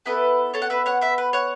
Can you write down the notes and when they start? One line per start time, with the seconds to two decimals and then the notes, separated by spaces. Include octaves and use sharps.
0.06 B3 E4 A4 B4
0.54 A4 C#5
0.62 F#5
0.70 B4 E5
0.86 C#5 F#5
1.01 B4 E5
1.18 B4
1.33 C#5 F#5